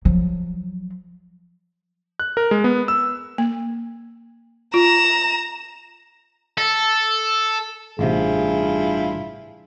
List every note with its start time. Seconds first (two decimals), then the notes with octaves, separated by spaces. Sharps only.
0.05 F3 F#3
2.20 F#6
2.37 A#4
2.51 G#3
2.64 B3
2.88 E6
3.38 A#3
4.74 F4 A#5 E7
6.58 A4
7.99 A1 G2 C3 E4 F4 G#4